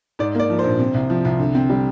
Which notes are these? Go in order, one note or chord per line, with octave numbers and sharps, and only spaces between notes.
G#2 D5
A#3 D5
F3
C5
A#1
C3
C2
F3
C2
D3
C4
G3